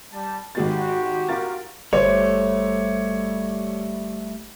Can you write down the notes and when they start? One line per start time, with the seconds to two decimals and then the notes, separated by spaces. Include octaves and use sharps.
0.11 G3 A5
0.55 G#1 G#3 F#4 G4 A6
1.29 F4 A#4 A6
1.93 G1 G3 A3 C5 C#5